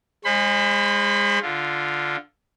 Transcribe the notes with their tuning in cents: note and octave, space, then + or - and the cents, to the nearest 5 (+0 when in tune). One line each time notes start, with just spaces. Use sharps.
G#3 -20 C5 +35 B5 +25
D3 +0 F4 -5